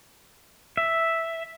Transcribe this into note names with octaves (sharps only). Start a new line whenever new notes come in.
E5